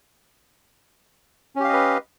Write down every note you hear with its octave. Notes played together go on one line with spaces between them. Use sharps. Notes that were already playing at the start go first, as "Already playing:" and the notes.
C#4 G4 B4 D#5 F5